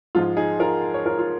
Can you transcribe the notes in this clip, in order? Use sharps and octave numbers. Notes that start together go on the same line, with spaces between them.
G#2 F3 G#3 F4
D#4 G#4
F4 A#4
C#5
F4 A#4
F4